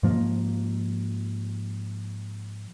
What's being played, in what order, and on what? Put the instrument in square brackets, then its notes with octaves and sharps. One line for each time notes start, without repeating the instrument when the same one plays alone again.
[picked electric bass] G#2 F3 A#3